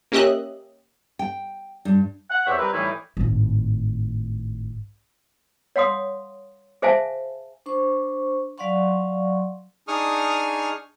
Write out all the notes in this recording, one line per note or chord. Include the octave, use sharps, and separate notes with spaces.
A#3 C#4 G4 D#5 E5 F#6
G5
G2
F#5
E2 C4 G4 C#5 E5
G3 C4 A#4 B4
A2 E3 G3 A3 D#4 E4
G#1 A2
C#5 F5 F#5 C6 D#6
G#4 C5 E5 F5 G#5 A5
D4 C5 C#6
F#3 D5 F5 F#5 C6 C#6
D4 D#4 G#4 C#6 D#6 F6